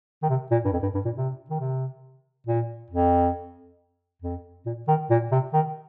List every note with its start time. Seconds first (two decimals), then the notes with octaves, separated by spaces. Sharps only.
0.23 D#3
0.29 C3
0.51 A#2
0.65 G2
0.72 F2
0.82 G2
0.94 G2
1.05 A#2
1.16 C3
1.50 D#3
1.60 C3
2.47 A#2
2.90 F2
4.22 F2
4.66 A#2
4.88 D#3
5.10 A#2
5.32 C3
5.53 D#3